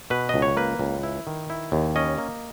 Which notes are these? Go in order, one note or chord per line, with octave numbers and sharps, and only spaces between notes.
B2 B4
C#2 D#5
C#5
A#3 B4
C#2
E4
D#3
E4
D#2
C#4 D#5
A#3